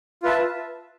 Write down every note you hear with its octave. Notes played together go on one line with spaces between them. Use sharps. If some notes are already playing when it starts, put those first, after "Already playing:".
F4 B4 E5 A5